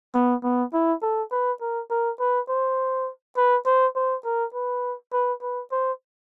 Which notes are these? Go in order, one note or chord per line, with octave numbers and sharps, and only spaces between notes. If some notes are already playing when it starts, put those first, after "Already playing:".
B3
B3
E4
A4
B4
A#4
A#4
B4
C5
B4
C5
C5
A#4
B4
B4
B4
C5